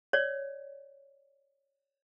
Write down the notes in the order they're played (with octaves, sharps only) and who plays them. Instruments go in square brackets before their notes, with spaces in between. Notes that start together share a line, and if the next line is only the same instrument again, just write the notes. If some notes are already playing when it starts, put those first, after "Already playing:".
[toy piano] C#5 D5